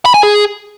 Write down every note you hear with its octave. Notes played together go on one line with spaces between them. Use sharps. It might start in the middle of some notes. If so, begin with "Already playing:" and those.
B5
G#5
G#4